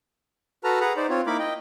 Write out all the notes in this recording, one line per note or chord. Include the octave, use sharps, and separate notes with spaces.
F#4 A4 B4 A5 A#5 F6
G#4 B4 F#5 A#5
D#4 C5 D5
C4 F4 C#5
A#3 D#4 E4 A#4 B5 D6
D#5 G5